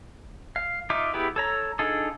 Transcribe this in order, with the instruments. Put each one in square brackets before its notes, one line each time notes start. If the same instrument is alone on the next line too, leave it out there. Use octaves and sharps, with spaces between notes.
[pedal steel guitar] F5
D#4 F4 E5 D6
B3 E4 G4 G#4 B4
A4 C#5 A#5
D4 D#4 F4 G#4 A4